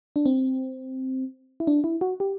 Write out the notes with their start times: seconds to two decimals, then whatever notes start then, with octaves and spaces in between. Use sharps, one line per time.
0.16 D4
0.26 C4
1.60 E4
1.67 D4
1.84 E4
2.01 F#4
2.20 G4